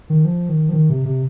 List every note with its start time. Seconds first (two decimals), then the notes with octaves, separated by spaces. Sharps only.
0.10 D#3
0.25 F3
0.49 D#3
0.69 F3
0.73 D#3
0.90 C3
1.05 C3